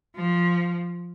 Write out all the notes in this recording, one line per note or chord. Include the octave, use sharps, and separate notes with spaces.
F3